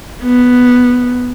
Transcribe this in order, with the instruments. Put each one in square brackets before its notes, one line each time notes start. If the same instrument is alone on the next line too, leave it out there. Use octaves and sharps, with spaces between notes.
[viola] B3